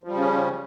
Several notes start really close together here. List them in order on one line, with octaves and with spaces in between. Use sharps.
F3 G3 C#3 C#4